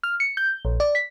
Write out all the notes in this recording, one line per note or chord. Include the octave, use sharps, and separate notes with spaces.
F6
C#7
G6
A#1
D5
B6